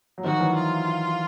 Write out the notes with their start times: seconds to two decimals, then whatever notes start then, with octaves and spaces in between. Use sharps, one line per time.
0.18 F#3
0.24 D#3 F3 F#4
0.39 E3 F#3
0.55 F4